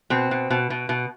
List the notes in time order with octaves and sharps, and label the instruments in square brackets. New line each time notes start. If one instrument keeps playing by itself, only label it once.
[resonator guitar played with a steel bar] B2 C4
B2
B2
B2
B2